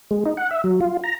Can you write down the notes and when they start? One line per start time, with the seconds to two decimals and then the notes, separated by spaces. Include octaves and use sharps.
0.11 G#3
0.26 D#4
0.37 F#5
0.51 E5
0.64 F#3
0.81 F4
1.04 A#5